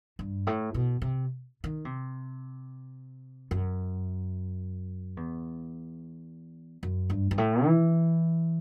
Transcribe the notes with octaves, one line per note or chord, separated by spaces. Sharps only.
G2
A2
B2
C3
D#3
C3
F#2
E2
F#2
G2
G2
A2
E3